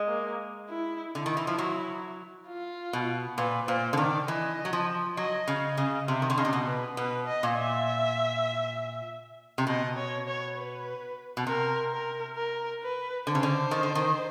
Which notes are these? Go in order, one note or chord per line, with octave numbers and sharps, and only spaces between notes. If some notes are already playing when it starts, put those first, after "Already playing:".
Already playing: G#3
A#3
E4
D3 E4
D#3
E3
F3
F#3
F4
B2
A#2 B4
A#2 C5
D3
D#3 D5
E3 D#5
F#3
F3
F#3 D#5
C#3
D#5
C#3
C3 E5
D#3
D3
C#3 D#5
C3
B2
B4
B2 B4
D#5
A#2
E5
C3
B2 D#5
C#5
C#5
B4
B2
C3 A#4
A#4
A#4
B4
D3 C5
C#3
D3
D#3
D3
D#3